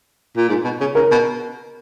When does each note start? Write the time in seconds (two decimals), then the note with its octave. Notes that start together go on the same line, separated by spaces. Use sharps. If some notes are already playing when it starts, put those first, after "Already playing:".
0.37 A#2
0.49 G#2
0.64 B2
0.80 C#3
0.95 C#3 A#4
1.11 B2